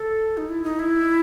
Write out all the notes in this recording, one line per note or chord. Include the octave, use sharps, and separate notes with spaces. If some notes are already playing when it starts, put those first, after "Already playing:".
Already playing: A4
D#4
E4
D#4
E4